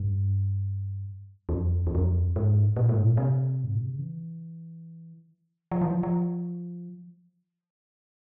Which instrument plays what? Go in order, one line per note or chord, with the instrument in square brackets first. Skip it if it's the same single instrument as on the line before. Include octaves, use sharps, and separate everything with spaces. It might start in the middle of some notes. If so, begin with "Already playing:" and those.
Already playing: [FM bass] G2
E2
F2
E2
F2
G#2
A#2
G#2
A#2
C3
G#2
A#2
C3
C#3
E3
F3
E3
F3
F3